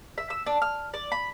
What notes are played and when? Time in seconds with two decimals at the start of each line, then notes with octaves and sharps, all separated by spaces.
0.18 E5
0.30 E6
0.46 D4
0.62 F6
0.94 D5
1.12 B5